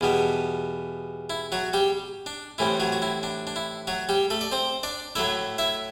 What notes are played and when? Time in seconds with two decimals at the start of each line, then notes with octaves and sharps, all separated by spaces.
0.01 E2 B2 G3 B3
1.30 E4
1.52 F#3 F#4
1.73 G3 G4
2.26 D4
2.58 A2 E3 G3 C4 E4
2.80 F#3 F#4
2.92 F#4
3.02 E4
3.23 D4
3.47 D4
3.56 E4
3.87 F#3 F#4
4.09 G3 G4
4.30 A3 A4
4.41 D5
4.52 C4 C5
4.83 D4 D5
5.15 A2 F#3 A3 E4 E5
5.58 E4 E5